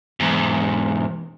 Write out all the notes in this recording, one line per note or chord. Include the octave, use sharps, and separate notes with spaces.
E2 G#2